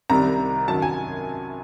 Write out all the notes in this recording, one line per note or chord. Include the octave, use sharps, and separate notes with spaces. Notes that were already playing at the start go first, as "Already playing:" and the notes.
C2 C3 D#3 G3 A#5
F#2 D#3 F#3 A5
G#5